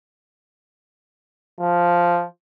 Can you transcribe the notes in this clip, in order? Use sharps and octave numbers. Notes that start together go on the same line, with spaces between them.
F3